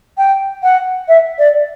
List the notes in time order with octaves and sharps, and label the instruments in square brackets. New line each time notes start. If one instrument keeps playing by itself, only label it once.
[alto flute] G5
F#5
E5
D5